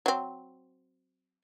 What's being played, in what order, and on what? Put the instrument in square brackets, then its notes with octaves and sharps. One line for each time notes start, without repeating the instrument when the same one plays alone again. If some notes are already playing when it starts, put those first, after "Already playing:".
[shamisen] F#3 C4